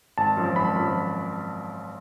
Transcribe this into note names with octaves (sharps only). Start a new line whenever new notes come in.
G#1 A5
F#2 F3
G#1 B5
F#2 F3